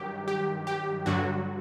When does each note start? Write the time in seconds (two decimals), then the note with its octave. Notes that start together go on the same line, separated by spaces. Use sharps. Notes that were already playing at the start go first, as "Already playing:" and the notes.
Already playing: G2 D#3 F#3 G4
0.28 G4
0.67 G4
1.06 G2 D3 F#3 F#4